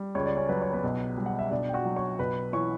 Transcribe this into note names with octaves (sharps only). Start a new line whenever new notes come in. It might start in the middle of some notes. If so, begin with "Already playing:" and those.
Already playing: G3
C#2 C#5
D5
C#4 C#5
F#3 B4
C#5
B3 B4
B1
G3
F#5
E5
B1 D4 D5
G5
F#4 F#5
F#3
C#5 C#6
B1 B4 B5
E3 C#5 C#6